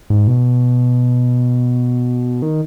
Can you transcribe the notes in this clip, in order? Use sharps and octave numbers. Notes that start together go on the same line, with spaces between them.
G#2
B2
D#3